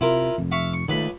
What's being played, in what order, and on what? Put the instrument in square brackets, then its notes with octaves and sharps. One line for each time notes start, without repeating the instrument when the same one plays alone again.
[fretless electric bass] C3 [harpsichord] E4 F4 A#4
[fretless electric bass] F1 F2
[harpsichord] E5 F5 C#6
C#6
[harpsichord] C#2 B4 B5 [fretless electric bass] D#3 A3